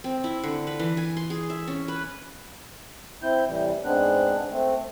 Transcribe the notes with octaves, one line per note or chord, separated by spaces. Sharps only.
C4
E4
D3
B4
E3
G#5
C6
G#4
E5
C#4
B4
C4 E4 G6
A2 C3 E3 G3
G#2 G#3 B3 C4 D4 F#6
A3 C4